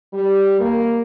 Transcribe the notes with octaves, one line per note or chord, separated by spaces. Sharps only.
G3
A#3